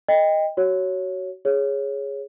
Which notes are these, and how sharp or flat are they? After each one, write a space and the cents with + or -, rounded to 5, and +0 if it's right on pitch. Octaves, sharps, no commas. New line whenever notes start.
D#5 +0 G5 +25
F#4 +25 C#5 +0
G#4 +0 C#5 -5